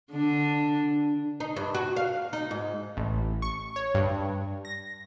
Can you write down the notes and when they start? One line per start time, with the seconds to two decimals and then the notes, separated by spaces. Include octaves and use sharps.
0.12 D3 D4
1.40 D#4
1.56 G2
1.75 F#4
1.96 F5
2.33 D#4
2.51 G#2
2.97 A1
3.42 C#6
3.76 C#5
3.94 G2
4.65 A#6